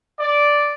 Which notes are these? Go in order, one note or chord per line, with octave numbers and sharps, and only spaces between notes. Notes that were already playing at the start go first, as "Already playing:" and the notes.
D5